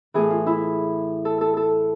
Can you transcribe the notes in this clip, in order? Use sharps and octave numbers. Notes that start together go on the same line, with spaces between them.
A2 E3 G#4
F4
E4
A4
A4
A4